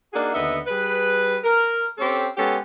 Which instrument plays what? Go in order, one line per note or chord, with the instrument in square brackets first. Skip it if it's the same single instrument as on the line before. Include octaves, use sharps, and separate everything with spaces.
[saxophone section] A#3 D4 D#4 F#4 G#4
D#2 D3 B3 D#5 E5
G3 G#4 B4
A#4
C4 C#4 G4 A4
G#3 B3 C#4 G4 A4